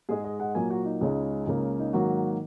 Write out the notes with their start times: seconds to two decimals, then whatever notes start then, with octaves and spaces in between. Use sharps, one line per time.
0.09 G#2 G#3 G#4
0.24 D#5
0.40 F#5
0.55 A#2 F#3 A#3 G#5
0.70 F#4
0.85 D#4
1.01 C#2 C#3 G#3
1.47 C#2 C#3 A#3
1.80 D#4
1.93 G#2 D#3 F#3 A#3 F#4